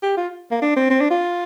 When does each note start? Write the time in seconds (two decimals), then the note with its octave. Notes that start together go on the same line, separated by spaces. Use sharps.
0.03 G4
0.17 F4
0.51 A#3
0.62 D4
0.76 C4
0.90 C4
1.01 D4
1.11 F4